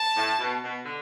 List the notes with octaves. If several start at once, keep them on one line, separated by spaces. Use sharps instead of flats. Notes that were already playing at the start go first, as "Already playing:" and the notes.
Already playing: A5
A2
B2
B2
D3